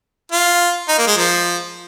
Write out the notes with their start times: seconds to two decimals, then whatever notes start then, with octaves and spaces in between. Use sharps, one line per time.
0.32 F4
0.88 D#4
0.98 A#3
1.07 G#3
1.17 F3